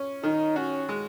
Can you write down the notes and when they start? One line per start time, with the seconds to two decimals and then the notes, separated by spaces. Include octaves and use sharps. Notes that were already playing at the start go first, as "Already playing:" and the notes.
Already playing: C#4
0.23 D#3 D#4
0.56 C#4 F#4
0.89 G#3